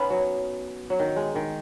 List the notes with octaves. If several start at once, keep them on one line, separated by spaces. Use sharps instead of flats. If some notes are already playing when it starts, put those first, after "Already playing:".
Already playing: B3 C#4 D#4
F#3
F#3
D#3
G#3
D#3